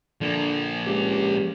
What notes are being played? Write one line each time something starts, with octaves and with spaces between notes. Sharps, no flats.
D3 F3 A#3
C#2 G4